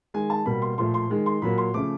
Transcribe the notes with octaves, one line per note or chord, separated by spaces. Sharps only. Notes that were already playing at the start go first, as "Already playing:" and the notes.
D#3 G#3 G#5
A5
B2 G3 A#3 B5
C6
A#2 F3 A3 C6
C6
D#3 G#3
C6
A#2 F#3 A#3 B5
C6
C#3 F3 A3 D6